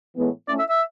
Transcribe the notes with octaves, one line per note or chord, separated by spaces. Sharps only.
A2 E3 G#3 B3
A3 C#4 E4 D5
E5
E5